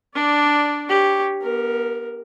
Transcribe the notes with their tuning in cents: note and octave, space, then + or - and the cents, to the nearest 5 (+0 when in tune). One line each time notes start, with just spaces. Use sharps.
D4 +0 D5 -10
G4 +0 C#5 +0
B3 -35 A#4 +0